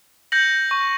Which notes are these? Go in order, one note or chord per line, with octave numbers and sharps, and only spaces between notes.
G6 A#6 C#7 F#7
C#6